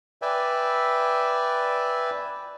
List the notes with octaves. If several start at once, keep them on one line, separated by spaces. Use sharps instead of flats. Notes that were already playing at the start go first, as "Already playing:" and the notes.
B4 D5 E5 G5 G#5